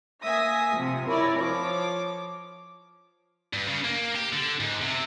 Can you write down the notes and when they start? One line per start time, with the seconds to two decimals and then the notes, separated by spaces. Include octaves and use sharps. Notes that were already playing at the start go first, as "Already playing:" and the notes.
0.25 A#3 E5 G#5 D#6 A#6 B6
0.77 C3 F3
1.08 E4 A#4 C#5 D5
1.39 F3 C#5 D6
3.53 G2
3.68 C#3
3.85 A#3
4.16 G4
4.33 D3
4.60 G#2
4.82 C3